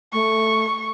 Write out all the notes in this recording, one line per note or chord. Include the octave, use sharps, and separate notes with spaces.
A3 C#6